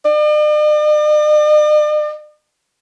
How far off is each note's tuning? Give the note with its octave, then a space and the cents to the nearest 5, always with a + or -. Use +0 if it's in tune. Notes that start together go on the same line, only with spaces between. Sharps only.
D5 +45